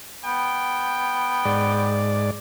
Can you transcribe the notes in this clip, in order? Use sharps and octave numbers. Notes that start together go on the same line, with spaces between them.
B3 G5
G#2 D5